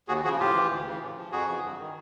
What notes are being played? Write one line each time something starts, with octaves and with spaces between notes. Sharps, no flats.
D#2 F#4 G#4
C#3 F3 F#4 G#4
A2 F4 G4
E3
D2
C#3 E3
A2
F3
F2 F#4 G#4
C#3 E3
G2
D#3